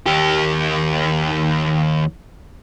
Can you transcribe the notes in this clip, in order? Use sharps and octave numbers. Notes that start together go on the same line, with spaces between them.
D#2 G4